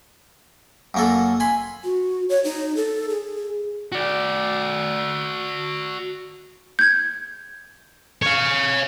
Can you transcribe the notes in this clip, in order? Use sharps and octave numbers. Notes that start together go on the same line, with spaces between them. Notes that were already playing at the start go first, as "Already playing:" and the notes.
F#2 A#3 A4
G#5 B5 C6
F#4
C#5
D#4
A4
G#4
F#4 D5
G6 G#6
C#5 F5